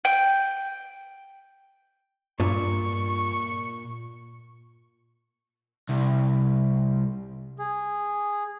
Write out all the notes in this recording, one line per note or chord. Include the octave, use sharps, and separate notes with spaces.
G5
G2 A#2 C#6
C2
G#4